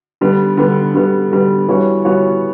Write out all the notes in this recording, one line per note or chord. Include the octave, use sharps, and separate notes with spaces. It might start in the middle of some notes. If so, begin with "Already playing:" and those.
D3 G3 B3
D3 G3 B3
D3 G3 B3
D3 G3 B3
E3 G3 B3 F#4 C#5
E3 G3 B3 F#4 C#5